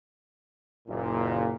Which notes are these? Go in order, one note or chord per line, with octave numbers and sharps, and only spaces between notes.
F#1 A#2